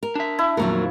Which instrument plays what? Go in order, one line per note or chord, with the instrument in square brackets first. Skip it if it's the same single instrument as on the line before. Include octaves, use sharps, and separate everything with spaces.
[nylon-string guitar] A#4
[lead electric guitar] D4 E5
[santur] E4
[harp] D#1 F2 F#4 [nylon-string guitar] F#3 A#3 A#4